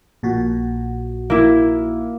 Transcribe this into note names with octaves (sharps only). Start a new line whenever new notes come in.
A#1 A#2 F#4
A#3 E4